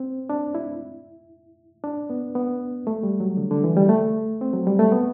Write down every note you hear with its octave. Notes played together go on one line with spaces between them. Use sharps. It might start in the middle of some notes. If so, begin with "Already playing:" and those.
Already playing: C4
D4
E4
D4
B3
B3
A3
G3
F#3
D3
D3
E3
G3
A3
C4
F#3
G3
A3
B3